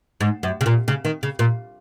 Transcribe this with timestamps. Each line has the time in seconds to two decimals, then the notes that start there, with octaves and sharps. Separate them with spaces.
0.21 G#2
0.43 F#2
0.61 C#3
0.66 A#2
0.88 C#3
1.05 D#3
1.23 C#3
1.39 A#2